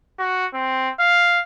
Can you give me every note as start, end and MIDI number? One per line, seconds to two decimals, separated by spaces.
0.19 0.46 66
0.54 0.89 60
1.00 1.41 77